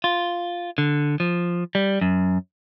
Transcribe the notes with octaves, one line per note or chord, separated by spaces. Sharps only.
F4
D3
F3
G3
F#2